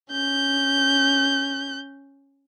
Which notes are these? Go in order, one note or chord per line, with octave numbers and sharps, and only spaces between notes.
C#4 G6